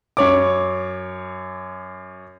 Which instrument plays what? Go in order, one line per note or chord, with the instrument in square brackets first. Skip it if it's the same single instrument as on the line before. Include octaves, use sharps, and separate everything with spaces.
[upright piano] F#2 C#5 D6